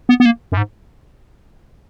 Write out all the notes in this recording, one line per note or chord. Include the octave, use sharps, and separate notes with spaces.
B3
B3
A#3
F#2
G#2